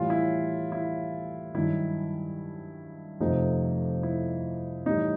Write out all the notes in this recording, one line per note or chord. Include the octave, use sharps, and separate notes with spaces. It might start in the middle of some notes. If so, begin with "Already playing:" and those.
Already playing: A2 E3 G3 F4
E4
E4
G2 D#3 F#3 E4
F2 C3 F3 A3 D#4
E4
A2 E3 G3 D#4